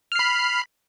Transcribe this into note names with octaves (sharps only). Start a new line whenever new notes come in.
B5 F6 C7